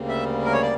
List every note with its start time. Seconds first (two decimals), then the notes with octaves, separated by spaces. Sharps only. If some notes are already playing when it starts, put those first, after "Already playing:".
Already playing: D2 C#3 G3 A#3
0.08 E5
0.44 A#4
0.53 C#5
0.62 D5